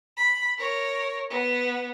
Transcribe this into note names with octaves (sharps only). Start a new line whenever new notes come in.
B5
A#4 C#5
B3